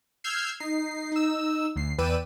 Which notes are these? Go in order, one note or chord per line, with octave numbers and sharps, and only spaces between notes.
E6 F6 G6 G#6 C7
D#4 C7
D#4 E6
D2 C7
E2 B4 D5 G5 E6 D#7